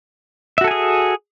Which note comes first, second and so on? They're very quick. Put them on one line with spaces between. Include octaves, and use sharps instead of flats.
E5 F#4 A4 G#5 G#4